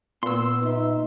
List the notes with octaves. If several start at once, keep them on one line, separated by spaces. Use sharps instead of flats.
A#2 B3 C6 E6
D#4 E5